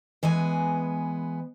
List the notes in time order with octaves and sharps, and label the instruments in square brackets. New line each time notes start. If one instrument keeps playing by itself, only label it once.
[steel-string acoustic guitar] E3 G#3 B3 G#5